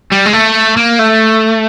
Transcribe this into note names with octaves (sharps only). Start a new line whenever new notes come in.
G3
G#3
A3
A#3
A3